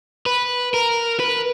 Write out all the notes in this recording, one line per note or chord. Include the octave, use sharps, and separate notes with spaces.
B4
A#4
B4